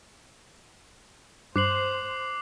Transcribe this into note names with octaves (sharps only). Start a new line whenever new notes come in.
G2 C5 D6 F#6 C7 F#7